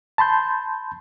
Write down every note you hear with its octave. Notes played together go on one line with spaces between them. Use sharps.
A5 B5 C6 G6